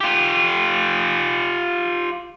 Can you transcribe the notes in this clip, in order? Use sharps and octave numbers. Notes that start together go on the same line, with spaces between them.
F4 G4